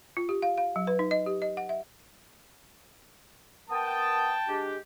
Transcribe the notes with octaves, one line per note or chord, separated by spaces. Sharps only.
F4
G4
F5
F5
F#3
B4
D#4
D#5
G4
D#5
F#5
E5
B3 A#4 G5 A5 D#6
G#3 D4 G4